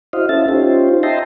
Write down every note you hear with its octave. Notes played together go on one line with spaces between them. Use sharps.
E4 F#4 C5 D#5 F5
C#4 E4 A4 E5 A6
C#4 D#4 F4 G4 C5
D#5 E5 G5 A5 A#5 C6